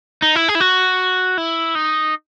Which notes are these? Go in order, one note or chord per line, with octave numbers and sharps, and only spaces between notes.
D#4
E4
G#4
E4
F#4
E4
D#4